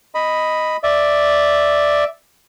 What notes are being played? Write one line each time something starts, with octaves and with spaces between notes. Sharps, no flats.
D#5 B5
D5 E5